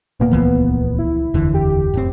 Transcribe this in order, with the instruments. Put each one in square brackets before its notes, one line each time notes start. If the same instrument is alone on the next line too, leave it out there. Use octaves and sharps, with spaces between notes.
[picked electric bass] D#1 A#2 A#3 [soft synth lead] B3
[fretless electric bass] C#2 E3 F3
[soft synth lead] E4
[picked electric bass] F1 [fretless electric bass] D#2 D3 E3
[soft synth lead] G4
[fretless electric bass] F#2 A2 C4